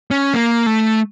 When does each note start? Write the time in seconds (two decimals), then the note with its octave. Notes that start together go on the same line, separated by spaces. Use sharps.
0.11 C#4
0.34 A#3
0.66 A3